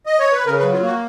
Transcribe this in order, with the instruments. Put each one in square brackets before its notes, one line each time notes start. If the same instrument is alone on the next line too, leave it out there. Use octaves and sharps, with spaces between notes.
[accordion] D#5
C#5
B4
C#3 A#4
B4
F#3
F4
A#3 F#4